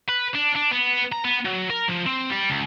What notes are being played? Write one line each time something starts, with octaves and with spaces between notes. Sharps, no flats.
B4
D4
D4
B3
A#5
B3
F#3
A#4
F3
C4
G3
C#2